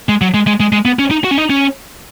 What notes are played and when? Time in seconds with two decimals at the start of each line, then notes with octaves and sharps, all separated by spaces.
0.09 G#3
0.21 F#3
0.34 G#3
0.47 G#3
0.60 G#3
0.72 G#3
0.85 B3
0.99 C#4
1.11 D#4
1.24 F#4
1.31 C#4
1.38 D#4
1.50 C#4